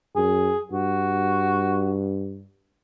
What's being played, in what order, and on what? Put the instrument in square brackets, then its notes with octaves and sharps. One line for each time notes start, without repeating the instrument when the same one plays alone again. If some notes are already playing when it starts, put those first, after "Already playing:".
[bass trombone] F#2 [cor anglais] G#4
[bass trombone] G2 [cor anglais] F#4